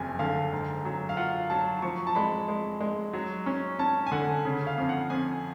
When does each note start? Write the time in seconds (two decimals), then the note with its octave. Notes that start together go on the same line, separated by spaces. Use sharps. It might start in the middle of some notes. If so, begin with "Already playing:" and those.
Already playing: F#1 F2 G#5
0.19 D3 F5
0.52 G#2
0.85 F#3
1.09 F5
1.17 F4 F#5
1.50 F#3 A5
1.82 F3 C#6
2.07 A5
2.15 G#3 B5
2.48 G#3
2.81 G#3
3.13 F#3
3.46 C#4
3.79 C#4 A5
4.07 G#5
4.12 D3 F#5
4.45 C#3
4.67 F5
4.78 F2
4.89 F#5
5.10 F2 G#5